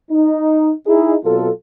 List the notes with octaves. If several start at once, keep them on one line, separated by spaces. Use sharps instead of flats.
D#4
D#4 E4 G#4
B2 F#3 C4 F4 A4